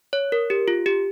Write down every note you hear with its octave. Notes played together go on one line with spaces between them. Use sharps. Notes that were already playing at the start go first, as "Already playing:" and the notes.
C#5
A#4
G4
F4
G4